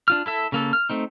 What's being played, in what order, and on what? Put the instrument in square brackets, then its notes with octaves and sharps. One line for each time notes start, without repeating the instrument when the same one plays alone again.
[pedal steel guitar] D4 F4 F6
E4 A4 E5
C#3 A#3 A4
F6
A3 C4 D#4